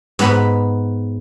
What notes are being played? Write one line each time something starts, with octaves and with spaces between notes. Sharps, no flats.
G#2 B3 B4 B5